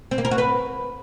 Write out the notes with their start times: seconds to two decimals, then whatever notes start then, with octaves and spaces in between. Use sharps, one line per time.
0.11 C4
0.18 A#3
0.25 A#4
0.31 F#4
0.38 B4